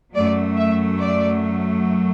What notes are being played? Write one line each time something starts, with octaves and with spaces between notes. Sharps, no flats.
F#2 F#3 A3 D5
E5
D5